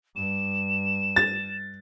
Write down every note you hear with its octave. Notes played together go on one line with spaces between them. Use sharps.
G2 E7
A6